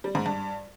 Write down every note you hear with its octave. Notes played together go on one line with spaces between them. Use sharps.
G3
G#2
G2